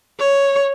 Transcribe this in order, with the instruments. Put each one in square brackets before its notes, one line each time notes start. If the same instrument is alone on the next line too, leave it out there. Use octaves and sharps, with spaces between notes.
[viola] C#5